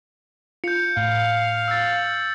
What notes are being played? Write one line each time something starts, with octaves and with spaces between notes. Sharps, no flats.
F4 G6 C#7
A2 F5
E6 A6